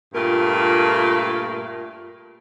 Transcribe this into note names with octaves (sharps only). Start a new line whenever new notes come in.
G2 A#2 A3 F4 A#4